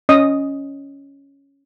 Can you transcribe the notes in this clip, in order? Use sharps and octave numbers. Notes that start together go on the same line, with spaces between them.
C#4 D#5 D#6